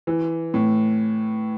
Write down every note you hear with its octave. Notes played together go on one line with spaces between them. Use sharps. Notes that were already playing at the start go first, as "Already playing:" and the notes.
E3
A2